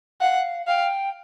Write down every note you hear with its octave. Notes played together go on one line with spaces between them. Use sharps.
F5 F#5
F5 G5